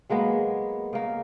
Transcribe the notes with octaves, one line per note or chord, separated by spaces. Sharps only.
F#3 G#3 A#3 B3
C#3 A#3